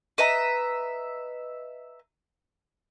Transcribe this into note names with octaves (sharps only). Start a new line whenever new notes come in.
B4 D#5 E5 A#5